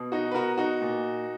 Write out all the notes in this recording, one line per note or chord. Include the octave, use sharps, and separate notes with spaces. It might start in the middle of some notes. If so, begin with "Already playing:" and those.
Already playing: B2
D#4 F#4
B4
B2 F#4 A#4
D#4 F#4
A#2